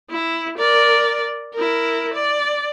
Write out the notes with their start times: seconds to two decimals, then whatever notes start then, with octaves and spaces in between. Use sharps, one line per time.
0.10 E4
0.58 A#4 D5
1.54 E4 A#4
2.14 D5